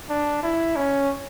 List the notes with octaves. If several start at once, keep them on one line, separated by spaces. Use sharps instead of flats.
D4
E4
C#4